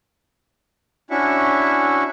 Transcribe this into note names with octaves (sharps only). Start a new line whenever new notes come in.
C#4 D4 E4 F#4 E5 C#6